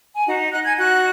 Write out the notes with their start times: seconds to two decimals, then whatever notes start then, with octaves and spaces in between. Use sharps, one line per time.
0.15 G#5
0.27 D#4 F#4 F#5
0.40 D#5
0.52 D#4 F#5 F#6
0.64 G#5 G#6
0.77 F#4 F#5 F#6